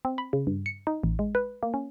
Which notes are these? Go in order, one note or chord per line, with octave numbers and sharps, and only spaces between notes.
C4
B5
C#3
G2
C#7
D#4
A1
G#3
B4
A#3
C#4